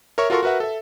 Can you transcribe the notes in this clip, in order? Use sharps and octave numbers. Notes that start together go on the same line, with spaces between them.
A#4 C#5 E5 C#6
F4 F#4 A4 A#4 C6 C#6
F#4 A#4 B4 E5 F#5
A4 E5